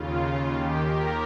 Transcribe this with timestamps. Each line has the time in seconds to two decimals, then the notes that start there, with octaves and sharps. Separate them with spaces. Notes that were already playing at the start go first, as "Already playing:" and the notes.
Already playing: D#2 C#3 F4
0.52 D#2 D#3 G4
0.84 A#4